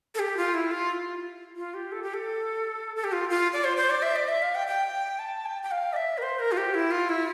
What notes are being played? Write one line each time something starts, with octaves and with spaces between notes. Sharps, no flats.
A4
G4
F4
E4
F4
F4
G4
A4
G4
A4
A4
G4
F4
F4
D5
C5
C5
D5
E5
D5
E5
F5
G5
G5
A5
G5
G5
F5
D5
E5
A#4
C5
A#4
F4
G4
E4
F4
E4